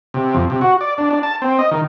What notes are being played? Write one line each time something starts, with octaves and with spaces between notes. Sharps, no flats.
C3
F2
C3
F#4
D5
D4
D4
A5
C4
D#5
D#3